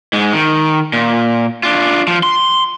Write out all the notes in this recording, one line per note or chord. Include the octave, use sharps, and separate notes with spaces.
G#2 G#3
D#3
A#2
D4 F4
F3
C6